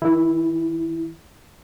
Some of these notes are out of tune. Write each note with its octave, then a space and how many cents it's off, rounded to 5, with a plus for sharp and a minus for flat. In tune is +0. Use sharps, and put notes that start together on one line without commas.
D#3 +40 E4 +0